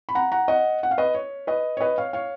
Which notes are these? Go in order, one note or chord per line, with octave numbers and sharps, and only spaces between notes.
B5
F#5 A#5
F#5 A#5
D#5 F#5
F#5
F5
B4 D#5
C#5
B4 D#5
C#5
B4 D#5
C#5 F5
C#5 F5